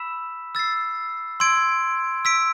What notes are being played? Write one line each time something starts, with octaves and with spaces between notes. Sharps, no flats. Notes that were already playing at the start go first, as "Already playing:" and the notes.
Already playing: B5 E6 B6 E7
E6 A6 C7
C6 E6 G#6 D7
E6 B6 D7